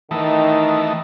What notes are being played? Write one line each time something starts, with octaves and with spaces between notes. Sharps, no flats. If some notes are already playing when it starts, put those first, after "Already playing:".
D#3 E3 A3 D#4